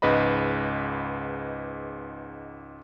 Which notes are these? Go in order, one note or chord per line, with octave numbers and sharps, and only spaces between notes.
C#2 G#2 B4 D#5 B5